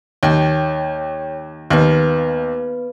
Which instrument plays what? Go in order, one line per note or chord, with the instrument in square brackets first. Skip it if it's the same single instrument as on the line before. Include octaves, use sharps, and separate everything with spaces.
[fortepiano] D#2 [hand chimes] C#5 G5
[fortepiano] D#2 [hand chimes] B3 B4